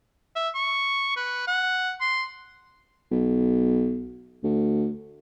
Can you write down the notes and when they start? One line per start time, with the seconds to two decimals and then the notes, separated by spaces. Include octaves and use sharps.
0.35 E5
0.55 C#6
1.16 B4
1.47 F#5
2.01 C6
3.11 B1
4.43 D2